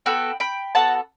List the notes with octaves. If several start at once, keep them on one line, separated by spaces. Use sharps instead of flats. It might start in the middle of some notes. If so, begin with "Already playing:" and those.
B3 F#4 A4 G5 B5
G5 B5
B3 F#4 A4 F#5 A5